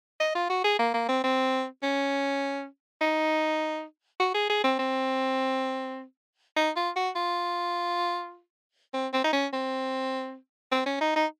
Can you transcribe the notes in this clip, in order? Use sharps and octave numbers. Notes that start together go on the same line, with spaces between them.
D#5
F4
F#4
G#4
A#3
A#3
C4
C4
C#4
D#4
F#4
G#4
G#4
C4
C4
D#4
F4
F#4
F4
C4
C4
D#4
C#4
C4
C4
C#4
D#4
D#4